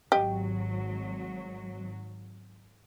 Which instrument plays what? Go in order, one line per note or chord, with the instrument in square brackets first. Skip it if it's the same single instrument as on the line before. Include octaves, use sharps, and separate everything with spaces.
[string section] G#1 F#3 [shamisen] G4 D#5